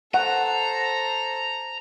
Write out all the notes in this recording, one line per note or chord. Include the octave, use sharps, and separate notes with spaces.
A4 C5 F#5 A#5